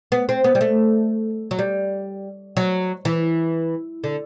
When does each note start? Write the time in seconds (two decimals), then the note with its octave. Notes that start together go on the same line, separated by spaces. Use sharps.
0.12 B3
0.29 C4
0.44 B3
0.55 G3
0.61 A3
1.51 F#3
1.59 G3
2.57 F#3
3.05 E3
4.04 D3